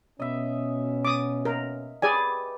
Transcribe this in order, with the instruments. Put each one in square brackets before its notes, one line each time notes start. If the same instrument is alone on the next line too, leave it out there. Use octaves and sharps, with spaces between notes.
[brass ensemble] B2 B3 C#4 [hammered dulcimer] D#5 E5
[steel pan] D6 D#6
A#4
[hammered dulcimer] G4 B4 [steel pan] G#4 D5 G#5